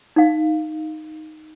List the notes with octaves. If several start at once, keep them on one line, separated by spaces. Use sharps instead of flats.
D#4 F5